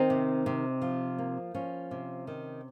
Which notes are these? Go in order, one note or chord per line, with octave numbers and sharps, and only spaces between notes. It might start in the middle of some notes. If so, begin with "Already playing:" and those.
Already playing: D#3 C4 D#4
C3
C3
F3
A#3
F3 C#4
C3
D#3